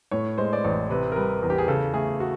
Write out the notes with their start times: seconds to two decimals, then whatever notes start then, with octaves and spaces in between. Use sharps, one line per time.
0.11 A2 C#5
0.38 G#3 C5
0.53 D5
0.64 A1 C#5
0.90 C3 B4
1.12 A#4
1.16 G3 B4
1.42 E2
1.50 G4
1.58 G#4
1.68 C#3 A4
1.94 A3 G#4
2.20 F#4